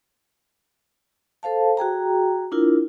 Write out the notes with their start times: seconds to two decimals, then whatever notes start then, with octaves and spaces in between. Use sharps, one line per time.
1.43 A4 C5 F5 A5
1.77 F#4 G#4 G5 A#5
2.52 D4 E4 F4 A#4